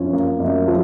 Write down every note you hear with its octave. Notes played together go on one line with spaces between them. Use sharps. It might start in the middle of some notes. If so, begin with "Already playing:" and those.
Already playing: F#2 F3 C#4
A#3
F#2
F3